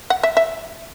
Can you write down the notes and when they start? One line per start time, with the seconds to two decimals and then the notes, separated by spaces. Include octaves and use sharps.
0.10 F#5
0.23 E5
0.37 E5